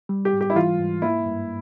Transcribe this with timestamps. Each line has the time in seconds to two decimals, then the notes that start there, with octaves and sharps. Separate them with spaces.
0.09 G3
0.25 G4
0.33 G#2
0.41 G4
0.50 E4
0.55 E3 F4
0.79 G#2
1.02 A#3 E4
1.26 G2